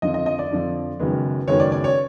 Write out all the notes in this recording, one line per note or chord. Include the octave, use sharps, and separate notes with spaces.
F2 D3 F3 D#5
D#5
D#5
D5
F2 D3 F3
F#1 F#2 D#3 G#3 B3
F#1 F#2 D#3 G#3 B3 C#5
D5
D5
C#5